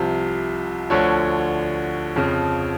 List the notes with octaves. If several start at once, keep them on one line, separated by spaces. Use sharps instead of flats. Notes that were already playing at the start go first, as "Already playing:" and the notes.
Already playing: C2 C3 F3
D2 D3 F3 C#5
F2 C#3 F3